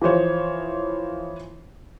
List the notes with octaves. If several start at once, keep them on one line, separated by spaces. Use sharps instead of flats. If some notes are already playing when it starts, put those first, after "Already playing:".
E3 F3 C5 C#5